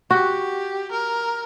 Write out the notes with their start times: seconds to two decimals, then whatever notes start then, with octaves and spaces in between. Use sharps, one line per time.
0.11 F#4 G4
0.92 A#4